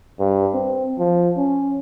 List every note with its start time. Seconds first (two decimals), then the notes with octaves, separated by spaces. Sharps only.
0.19 G2
0.54 C4
0.98 F3
1.37 C#4